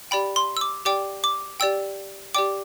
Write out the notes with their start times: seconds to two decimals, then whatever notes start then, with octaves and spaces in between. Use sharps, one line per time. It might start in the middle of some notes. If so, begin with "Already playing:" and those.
0.11 G4 D5 G5 B5
0.36 C6
0.57 E6
0.61 D6
0.85 G4 D5 G5 D6
1.24 D6
1.60 G4 D5 G5 E6
2.35 G4 D5 G5 D6